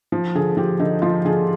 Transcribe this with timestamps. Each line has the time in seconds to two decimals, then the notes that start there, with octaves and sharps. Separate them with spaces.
0.12 F3
0.35 D3 G#4
0.57 F3 G4
0.79 D3 D#4
1.02 F3 F4
1.25 D3 G#4